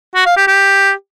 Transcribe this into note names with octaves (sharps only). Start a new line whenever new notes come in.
F#4
F5
G4
G4